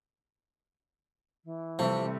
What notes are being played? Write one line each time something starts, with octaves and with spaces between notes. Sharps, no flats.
E3
C3 F3 G3 A3 C4